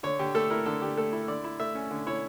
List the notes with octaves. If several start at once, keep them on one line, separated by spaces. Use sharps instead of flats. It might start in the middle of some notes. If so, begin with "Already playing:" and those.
D3 C#5
D3 G4
A3 A4
E4 A#4
D3 A4
D3 G4
A3 A4
E4
D3 D5
E4
A3 E5
C#4
D3
E4 C#5